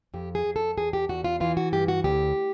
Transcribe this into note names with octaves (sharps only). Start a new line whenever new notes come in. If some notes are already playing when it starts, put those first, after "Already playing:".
F2 G4
G#4
F2
A4
E2 G#4
G4
E2 F#4
F4
E3 F4
F#4
G2 G4
F#4
D2 G4